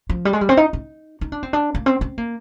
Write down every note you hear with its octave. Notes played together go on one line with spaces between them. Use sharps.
F3
G3
G#3
G3
C4
D#4
D#4
D#4
D4
C4
D4
A#3
C4
C4
A#3